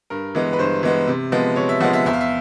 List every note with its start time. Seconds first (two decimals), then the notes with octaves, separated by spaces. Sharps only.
0.10 G2 A#4
0.35 E3 G#3 B3
0.53 B4
0.59 G2 C5
0.83 E3 G#3 B3
1.07 C3
1.32 F3 G#3 B3
1.56 C3 C#5
1.69 E5
1.81 F3 G#3 B3 F#5
1.93 E5
2.06 E2 E5
2.13 F5
2.21 E5